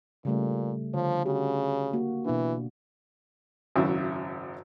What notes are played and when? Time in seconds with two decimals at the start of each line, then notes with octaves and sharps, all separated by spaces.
0.25 A#2 C#3 G3 A3
0.94 D3 F3 C#5
1.26 C#3 F#4 G4
1.93 A#3 F#4
2.25 B2 E3 D4
3.76 G#1 F#2 C#3 E4 E5